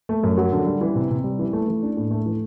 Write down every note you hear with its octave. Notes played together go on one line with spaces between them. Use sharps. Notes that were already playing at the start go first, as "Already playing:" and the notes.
A3
F#2
F#3
D3
G3
E3
C3
C3
G3
E3
A3
E3
D4
A2
A3
E3